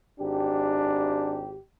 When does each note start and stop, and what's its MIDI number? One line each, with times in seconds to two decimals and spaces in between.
0.20 1.58 32
0.20 1.44 62
0.20 1.58 67